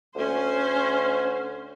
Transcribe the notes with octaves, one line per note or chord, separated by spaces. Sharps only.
D2 C#4 C5